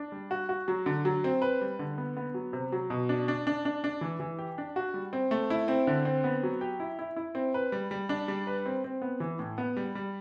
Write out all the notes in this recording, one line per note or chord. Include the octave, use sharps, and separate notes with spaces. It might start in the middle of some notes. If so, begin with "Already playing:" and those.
Already playing: D4
G3
F#4
F#4
F#3
D3
F#3
C4
B4
G3
D3
B3
B3
F#3
C3
F#3
B2
D4
D4
D4
D4
D4
E3
E3
G4
D4
F#4
G3
C4
A3
E4
C4
D3
C4
B3
F#3
G4
E4
E4
E4
C4
B4
G3
G3
D4
G3
B4
C4
C4
B3
E3
A2
B3
G3
G3